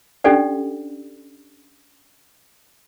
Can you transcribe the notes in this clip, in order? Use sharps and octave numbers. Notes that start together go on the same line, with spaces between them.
C#4 D4 G4 A4 D5 F#5